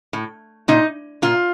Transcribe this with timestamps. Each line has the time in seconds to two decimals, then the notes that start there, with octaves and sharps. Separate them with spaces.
0.13 A2
0.68 A#2 D#4
1.22 A#2 F4